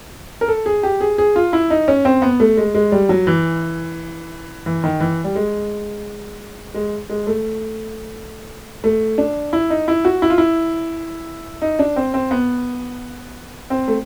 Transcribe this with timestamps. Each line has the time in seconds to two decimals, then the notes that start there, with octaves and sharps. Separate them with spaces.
0.41 A#4
0.48 A4
0.66 G#4
0.83 G4
1.01 G#4
1.18 G#4
1.36 F4
1.53 E4
1.70 D#4
1.88 C#4
2.05 C4
2.22 B3
2.40 A3
2.57 G#3
2.75 G#3
2.92 G3
3.09 F#3
3.27 E3
4.66 E3
4.84 D#3
5.00 E3
5.24 G3
5.35 G#3
6.74 G#3
7.09 G#3
7.27 A3
8.84 A3
9.18 D4
9.53 E4
9.70 D#4
9.88 E4
10.05 F#4
10.22 E4
10.30 F4
10.38 E4
11.62 D#4
11.79 D4
11.96 C4
12.14 C4
12.31 B3
13.70 C4
13.88 A3